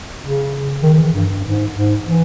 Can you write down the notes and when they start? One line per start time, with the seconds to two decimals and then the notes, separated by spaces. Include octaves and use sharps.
0.22 C#3
0.83 D#3
0.94 D#3
0.99 E3
1.13 G2
1.29 G2
1.44 G#2
1.75 G#2
2.05 E3